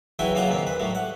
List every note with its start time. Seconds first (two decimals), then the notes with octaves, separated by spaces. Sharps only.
0.19 E2 F#3 E4 F#4 G5 G#5
0.35 C#3 F#3 A#3 F4 F#5 A#5
0.50 D#2 A#2 C4
0.67 B4
0.80 A2 F#3 G3
0.95 F#5